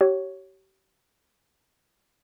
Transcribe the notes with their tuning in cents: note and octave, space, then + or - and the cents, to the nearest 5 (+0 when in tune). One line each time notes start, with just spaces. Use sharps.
G4 -35 C#5 +0